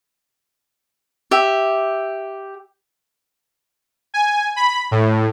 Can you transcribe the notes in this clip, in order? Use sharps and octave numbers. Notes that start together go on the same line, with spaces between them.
G4 E5
G#5
B5
A2